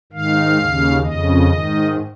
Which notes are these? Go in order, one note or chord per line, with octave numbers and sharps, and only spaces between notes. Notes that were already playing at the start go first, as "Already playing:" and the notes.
G#2 D#3 F5
D#2 C#3
F2 C#3 D#5
G#2 D#3